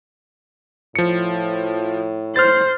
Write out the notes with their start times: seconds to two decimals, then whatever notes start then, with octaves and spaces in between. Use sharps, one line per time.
0.95 A2 F3 C#7
2.36 C5 F6 A6